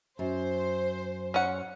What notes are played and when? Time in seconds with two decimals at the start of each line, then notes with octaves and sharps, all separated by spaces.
0.19 F#2 C5
1.34 C#4 F#5